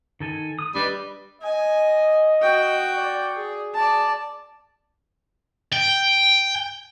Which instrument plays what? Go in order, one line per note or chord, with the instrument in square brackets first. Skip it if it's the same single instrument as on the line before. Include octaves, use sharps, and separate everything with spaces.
[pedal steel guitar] D#3 A4 G#5
D#6
[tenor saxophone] G3 [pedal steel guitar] D4 B4 D#5
[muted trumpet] D#5 [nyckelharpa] G#5
[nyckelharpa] F#4 G5
[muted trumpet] D5
[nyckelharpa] G#4
[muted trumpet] G#4 [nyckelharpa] D5 A5
[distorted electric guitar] G5